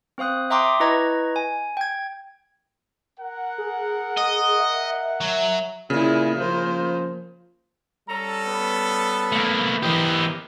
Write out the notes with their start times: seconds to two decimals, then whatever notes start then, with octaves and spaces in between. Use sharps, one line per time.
0.18 C4 C5 F5 D#6 F#6
0.50 E5 G5 A#5 C6 D6 D#6
0.80 E4 B4 D#5 A#5 C#6 G#6
1.36 G#5
1.77 G5 G#6
3.19 A#4 F#5
3.58 G#4
4.17 D#5
4.59 E5
5.21 F#3
5.90 A#2 C#3 E4 G#4
6.37 F3 A#3 C5
8.09 G3 C#4 A4 A#5
8.46 B3
9.32 A3 A#3
9.83 E3 G4 A#4 C5 D#5